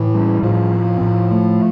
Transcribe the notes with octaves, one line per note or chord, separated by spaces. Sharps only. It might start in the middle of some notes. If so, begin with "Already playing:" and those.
Already playing: A2 E3
G3
A2 F3
C4
A2
A3